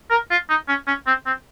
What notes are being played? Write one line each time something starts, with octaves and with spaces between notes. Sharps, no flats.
A#4
F4
D#4
C#4
C#4
C4
C4